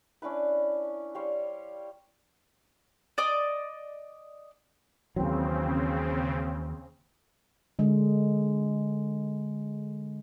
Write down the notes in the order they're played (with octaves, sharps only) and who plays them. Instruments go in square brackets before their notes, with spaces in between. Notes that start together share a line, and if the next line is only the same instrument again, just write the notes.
[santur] C#4 D4 E4 B4
G3 C5 C#5 F5
[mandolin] D5 D#5 D6
[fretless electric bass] D#2 E3 F#3 [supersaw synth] C#3 C4
[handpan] D3 G#3